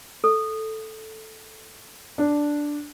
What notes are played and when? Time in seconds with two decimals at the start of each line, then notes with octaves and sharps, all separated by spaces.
0.24 A4
2.18 D4